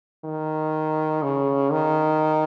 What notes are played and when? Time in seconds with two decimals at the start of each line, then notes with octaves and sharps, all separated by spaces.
0.25 D#3
1.23 C#3
1.72 D#3